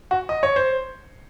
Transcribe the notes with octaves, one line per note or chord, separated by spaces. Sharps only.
F#4
D#5
C#5
C5